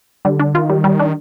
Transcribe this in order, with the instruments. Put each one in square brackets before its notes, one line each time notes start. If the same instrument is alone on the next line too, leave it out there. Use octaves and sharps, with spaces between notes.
[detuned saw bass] D3 [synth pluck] G3
[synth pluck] D4
[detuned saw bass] D#3 [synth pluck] F4
[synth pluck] G3
G3
D4